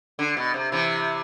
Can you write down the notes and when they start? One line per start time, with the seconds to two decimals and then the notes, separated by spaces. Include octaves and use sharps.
0.19 D3
0.37 B2
0.54 C3
0.72 C3 E3